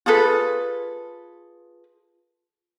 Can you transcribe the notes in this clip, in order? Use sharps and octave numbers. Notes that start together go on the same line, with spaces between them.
F4 G#4 A4 B4